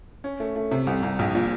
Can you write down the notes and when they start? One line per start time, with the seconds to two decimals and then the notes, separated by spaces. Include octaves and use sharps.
0.24 C#4
0.40 A3
0.56 A3
0.71 C3
0.87 C2
1.03 C2
1.19 A#1
1.35 A#2